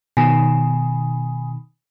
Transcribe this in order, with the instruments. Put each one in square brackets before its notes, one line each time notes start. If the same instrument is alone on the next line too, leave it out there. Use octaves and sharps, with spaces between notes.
[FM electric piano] B2 D#3 [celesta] G#5